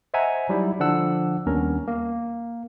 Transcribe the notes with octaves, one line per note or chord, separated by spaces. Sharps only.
C5 D#5 E5 F#5 G#5 A#5
F#3 G3 D#4 E4
D3 F3 D4 F#5 E6
D#2 G3 B3 C#4 D4 A#4
A#3